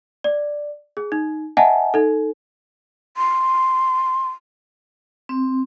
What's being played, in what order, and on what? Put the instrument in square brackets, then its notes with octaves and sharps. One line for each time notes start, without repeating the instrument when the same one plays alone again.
[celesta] D5
G#4
D#4
D#5 E5 F#5 G#5 A5
D#4 A4
[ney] C6
[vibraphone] C4